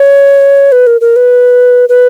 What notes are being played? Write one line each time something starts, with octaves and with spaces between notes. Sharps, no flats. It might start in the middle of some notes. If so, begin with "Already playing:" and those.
Already playing: C#5
B4
A#4
A#4
B4
B4